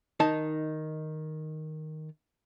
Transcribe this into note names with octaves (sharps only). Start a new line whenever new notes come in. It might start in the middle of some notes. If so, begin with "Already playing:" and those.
D#3 D#4 A5